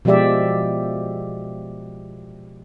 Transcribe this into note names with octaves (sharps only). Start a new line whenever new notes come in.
B2 F3 G#3 G4 D5 E5